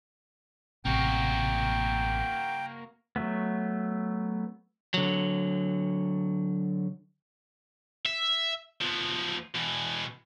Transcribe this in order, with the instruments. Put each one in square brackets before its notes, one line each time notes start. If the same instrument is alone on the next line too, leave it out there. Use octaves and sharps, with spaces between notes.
[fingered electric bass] A1 C3 [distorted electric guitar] A#3 F#4 [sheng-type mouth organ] G5
[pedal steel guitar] F#3 A3 B3
[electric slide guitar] D3 F#3
[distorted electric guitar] E5
F3 B3
B2 E3